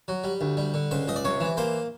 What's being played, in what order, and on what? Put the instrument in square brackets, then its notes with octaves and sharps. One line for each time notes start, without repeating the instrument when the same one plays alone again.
[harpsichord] F#3
G3
D2
G3
D3
C#2 C5
C#2 D#5
D5
C3 C#5
E3
A#3 C5